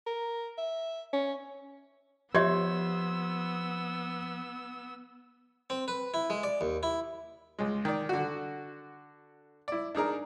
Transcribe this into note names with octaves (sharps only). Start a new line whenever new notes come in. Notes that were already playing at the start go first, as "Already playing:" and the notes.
A#4
E5
C#4
F3 B3 G4 C#5 E5 C6 E6 G#6
C4
B4
E4
G#3
D5
D#2
E4
C#2 G#3
D#3 D5
D3 F#4
E4 D5
D4 D#4 G#4 A#4